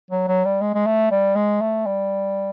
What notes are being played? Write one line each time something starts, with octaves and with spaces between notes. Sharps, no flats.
F#3
F#3
G3
G#3
G#3
A3
G3
G#3
A3
G3